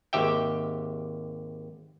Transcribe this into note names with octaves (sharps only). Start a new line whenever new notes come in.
G#1 D#2 G4 E5 G5